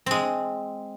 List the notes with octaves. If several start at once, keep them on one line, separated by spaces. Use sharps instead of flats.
G#3 C4